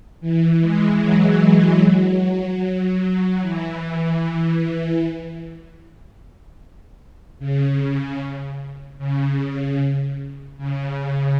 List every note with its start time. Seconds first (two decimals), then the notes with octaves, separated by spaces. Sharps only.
0.21 E3
0.61 G#3
1.00 F#3
1.80 F#3
3.40 E3
7.39 C#3
8.99 C#3
10.58 C#3